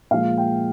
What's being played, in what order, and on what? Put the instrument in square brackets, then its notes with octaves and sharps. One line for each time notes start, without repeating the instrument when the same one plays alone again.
[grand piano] A#2 F3 G#3 F5
G5